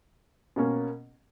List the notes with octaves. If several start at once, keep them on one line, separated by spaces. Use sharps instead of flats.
B2 A#3 C#4